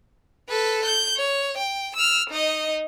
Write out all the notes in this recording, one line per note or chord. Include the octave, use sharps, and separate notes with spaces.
A4 B4
G6
C#5
G5
E6 F6
D#4 D#5